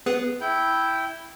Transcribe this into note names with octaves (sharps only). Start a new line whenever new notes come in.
B3 G#4 B4
E4 G5